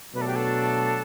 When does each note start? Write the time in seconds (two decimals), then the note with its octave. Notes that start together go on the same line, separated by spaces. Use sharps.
0.14 B2 F#3 A3 D4 B4
0.21 A4
0.27 G4
0.35 A4